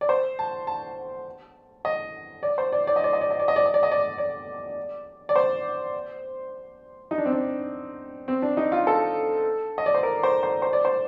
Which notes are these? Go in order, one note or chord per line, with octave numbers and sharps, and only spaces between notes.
D5
C5
A5
A5
D#5
D5
C5
D5
D5
D#5
D5
D#5
D5
D#5
D5
D#5
D5
D#5
D5
D#5
D5
D5
D5
C5
D#4
D4
C4
D4
C4
D4
D#4
F4
A4
D#5
D5
C5
A#4
C5
C5
C5
D5
C5